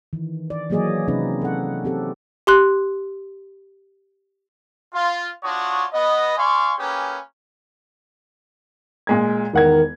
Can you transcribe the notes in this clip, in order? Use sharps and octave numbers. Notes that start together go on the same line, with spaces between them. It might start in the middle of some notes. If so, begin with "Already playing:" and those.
D#3 E3
D5
E3 F#3 A#3 G#4 D5 D#5
C3 C4 C#4 D#4 G#4 B4
A4 F#5
C4 G4 A4
G4 C6 F#6
F4
D4 F4 F#4 C#5 D#6
B3 D#5
D5 F5 G#5 C6 C#6
A#3 C#4 G4 G#4 B4
A#2 G#3 G#6
E1 D#3 A#4 F#5 G#6